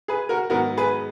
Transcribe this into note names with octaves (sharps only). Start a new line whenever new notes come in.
G#4 B4
F#4 A#4
G#2 D#3 F#3 B3 F#4 A#4
G#4 B4